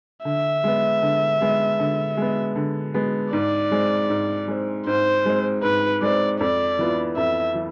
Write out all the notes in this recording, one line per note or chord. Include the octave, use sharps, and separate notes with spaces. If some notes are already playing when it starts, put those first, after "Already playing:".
D3 E5
G#3 B3
D3
G#3 B3
D3
G#3 B3
D3
G#3 B3
G#2 D5
G#3 C4
G#2
G#3 C4
G#2 C5
G#3 C4
G#2 B4
G#3 C4 D5
F2 D5
E3 B3 F4
F2 E5
E3